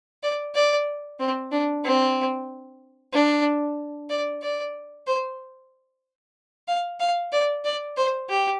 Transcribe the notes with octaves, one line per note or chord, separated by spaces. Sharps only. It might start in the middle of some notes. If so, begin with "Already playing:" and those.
D5
D5
C4
D4
C4
D4
D5
D5
C5
F5
F5
D5
D5
C5
G4